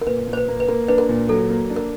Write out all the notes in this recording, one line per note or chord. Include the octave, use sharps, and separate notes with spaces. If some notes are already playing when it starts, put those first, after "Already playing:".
A#4
A#2 B4
A#2
C5
B4
A#3
B4
A#3 A#4
D4 B4
A#4
A#2
F#3 A4
A#3
D4
A#4